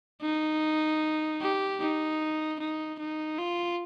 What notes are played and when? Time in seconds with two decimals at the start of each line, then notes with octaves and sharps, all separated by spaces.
0.22 D#4
1.41 G4
1.80 D#4
2.59 D#4
2.99 D#4
3.38 F4